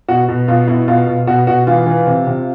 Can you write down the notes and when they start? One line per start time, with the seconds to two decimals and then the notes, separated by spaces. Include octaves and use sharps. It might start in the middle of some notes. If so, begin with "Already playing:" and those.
0.09 B2 F#4
0.29 B2
0.48 B2 F4
0.68 B2 E4
0.88 B2 F4
1.07 B2
1.27 B2 F#4
1.47 B2 F#4
1.67 E3 F4
1.86 E3
2.07 C3
2.27 C3